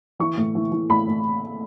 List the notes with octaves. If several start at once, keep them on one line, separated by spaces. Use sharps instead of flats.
E3 C#6
A2
E3
E3
A2 B5
A2